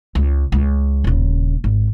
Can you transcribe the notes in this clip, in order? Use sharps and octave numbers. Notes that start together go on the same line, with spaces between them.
C#2
C#2
D#1 C#3
G#1